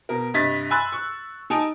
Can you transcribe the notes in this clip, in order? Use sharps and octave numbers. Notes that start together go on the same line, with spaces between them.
B2 A#4
G2 C3 D#5 G#6 A6 B6
G#5 B5 C6 E6 F#6 A6
C#6
D#4 G#5 A5 D#6 D7 F7